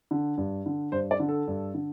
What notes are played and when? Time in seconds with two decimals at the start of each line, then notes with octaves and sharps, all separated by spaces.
0.11 D3
0.38 G2
0.66 D3
0.92 G2 C5
1.11 D5
1.20 D3
1.29 A4
1.48 G2
1.74 D3